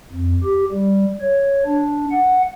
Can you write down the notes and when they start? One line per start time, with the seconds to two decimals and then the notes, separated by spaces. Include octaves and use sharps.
0.13 F2
0.43 G4
0.72 G3
1.21 C#5
1.66 D4
2.11 F#5